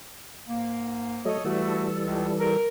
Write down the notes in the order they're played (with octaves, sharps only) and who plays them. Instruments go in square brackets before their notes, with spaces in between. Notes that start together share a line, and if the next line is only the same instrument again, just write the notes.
[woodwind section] G#2 A#3
[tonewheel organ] F#3 A3 [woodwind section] A4 C#5 D#5
[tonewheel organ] E3 G3 A4 [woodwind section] A3 F#4
[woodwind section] C#2
A#4